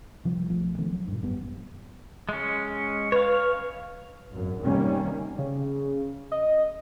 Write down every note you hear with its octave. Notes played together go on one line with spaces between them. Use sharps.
C3 F3 G3
B1 F3 A3
C3 D#3 A3 C4
F#3
G2 A#2
G#1 F#2 G3 B3
G#3 C#4
B4 C#5 F5
G#1 F#2
C3 D#3 G3 A#3 C#4
C#3
D#5